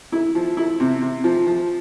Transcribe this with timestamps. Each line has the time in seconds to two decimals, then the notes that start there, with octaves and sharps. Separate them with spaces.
0.12 E4
0.35 F3
0.57 E4
0.80 C3
1.02 C3
1.24 F3
1.47 F3